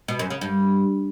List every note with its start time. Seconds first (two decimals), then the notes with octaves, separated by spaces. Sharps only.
0.08 B2
0.19 F#2
0.30 C#3
0.41 G2